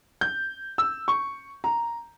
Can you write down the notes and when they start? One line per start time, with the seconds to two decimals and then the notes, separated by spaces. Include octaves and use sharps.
0.21 G6
0.78 E6
1.08 C#6
1.64 A#5